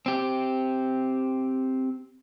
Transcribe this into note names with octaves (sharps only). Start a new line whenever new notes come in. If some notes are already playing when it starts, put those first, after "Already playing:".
C4 G4